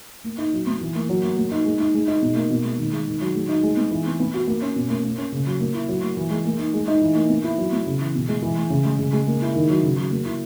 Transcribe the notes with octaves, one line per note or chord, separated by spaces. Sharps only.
A#3
D#4
F#3
B3
E3
A#3
F#3
A#3
A#3
D#4
G#3
D#4
G#3
D#4
B2
A#3
B2
G#3
D#3
G#3
D#3
F#3
G#3
D#4
G#3
B3
E3
B3
B3
F#4
A#3
C#4
B2
A#3
A#3
C#4
C#3
F#3
A#3
E4
F#3
A#3
E3
G#3
A#3
D#4
G#3
D#4
E3
A#3
B3
E4
F#3
B3
C#3
E3
B2
G#3
E3
G#3
C#3
G#3
C#3
G#3
A#3
E4
D#3
F#3
C#3
F#3
A#3
E4